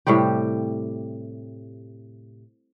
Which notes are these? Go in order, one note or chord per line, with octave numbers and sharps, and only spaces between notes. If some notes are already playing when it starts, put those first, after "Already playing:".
A2 C3 G3 G4